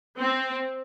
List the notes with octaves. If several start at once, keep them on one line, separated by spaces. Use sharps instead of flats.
C4